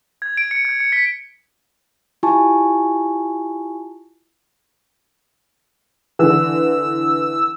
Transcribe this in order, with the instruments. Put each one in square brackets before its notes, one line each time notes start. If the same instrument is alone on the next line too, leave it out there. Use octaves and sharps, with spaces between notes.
[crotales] G#6
D7
C#7
G#6
C#7
B6
[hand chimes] E4 F4 G4 G#5 A5 C#6
[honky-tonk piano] D3 E3 [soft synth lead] E6